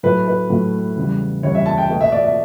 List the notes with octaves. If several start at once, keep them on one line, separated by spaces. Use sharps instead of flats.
A2 F#3 A3 B4
B4
A2 F#3 A3
E2 C#3 G3
E2 C#3 G3 C#5
E5
A5
G5
B2 A3
E5
D5
E5